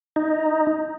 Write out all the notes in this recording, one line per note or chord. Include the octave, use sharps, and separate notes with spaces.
D#4